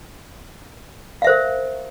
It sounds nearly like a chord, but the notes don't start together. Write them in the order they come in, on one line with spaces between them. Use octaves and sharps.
F5 E5 C5 A#4